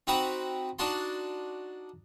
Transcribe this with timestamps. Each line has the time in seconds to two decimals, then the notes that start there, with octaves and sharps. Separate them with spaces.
0.07 C4 D#4 F#4 A#5 B5
0.79 D4 D#4 F#4 A5 C6